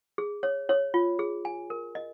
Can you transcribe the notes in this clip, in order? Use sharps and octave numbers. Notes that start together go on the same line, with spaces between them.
G#4
C#5
C#5
F4
G#4
G#5
A#4
D#5